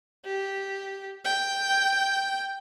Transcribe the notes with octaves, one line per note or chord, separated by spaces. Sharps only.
G4
G5